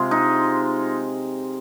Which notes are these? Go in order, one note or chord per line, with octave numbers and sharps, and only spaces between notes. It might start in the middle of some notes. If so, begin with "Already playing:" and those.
Already playing: C3 G#3 F4
D#4